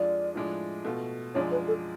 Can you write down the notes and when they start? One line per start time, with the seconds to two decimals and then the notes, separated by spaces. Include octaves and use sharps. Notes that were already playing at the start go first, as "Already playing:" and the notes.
Already playing: F2 F3 G#3 D4 F4 D5
0.35 A2 F3 G#3 D4
0.85 B2 A3 F4
1.35 F#2 F3 G#3 D4 C#5
1.51 B4
1.68 A4